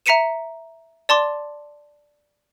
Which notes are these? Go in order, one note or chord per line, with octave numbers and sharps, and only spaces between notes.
E5 A#5 B6 C#7 D#7 E7
D5 A5 C6 D6